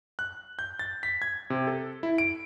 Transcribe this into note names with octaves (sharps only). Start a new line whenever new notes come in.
F#6
G6
A6
B6
G#6
C3
A4
E4
D7